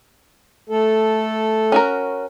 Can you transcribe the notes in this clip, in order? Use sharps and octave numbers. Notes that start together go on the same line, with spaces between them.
A3 A4
C#4 F#4 A#4